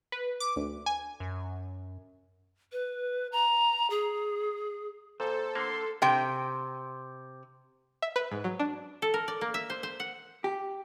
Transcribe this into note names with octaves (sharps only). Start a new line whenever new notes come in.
B4
D6
D2
G#5
F#2
B4
A#5
G#4
A#2 A4 C5
D3 A#3 C6
C3 G5
E5
B4
G#2
F#3
D4
A4
A#4
D5
A#3
E5
C5
C5
F#5
G4